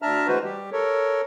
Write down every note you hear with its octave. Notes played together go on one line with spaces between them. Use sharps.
D2 D4 E5 A5 A#5 F6
E3 G#3 F#4 B4 C5
G3 G4
A4 A#4 C#5